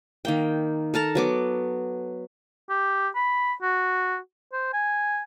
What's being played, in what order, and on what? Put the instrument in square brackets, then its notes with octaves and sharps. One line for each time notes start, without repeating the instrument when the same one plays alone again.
[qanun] D#3 A#3 G5
A4 A#4 A5 A#5
F#3 B3 D6
[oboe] G4
B5
F#4
C5
G#5